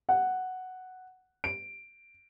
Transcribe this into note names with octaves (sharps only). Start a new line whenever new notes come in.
F#5
D7